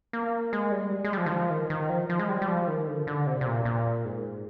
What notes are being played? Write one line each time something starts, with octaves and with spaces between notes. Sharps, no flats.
A#3
G#3
G3
G#3
G3
F3
D#3
F3
D#3
D#3
F3
F3
G#3
G3
G3
F3
D#3
D3
D3
C3
C3
A#2
A#2
G#2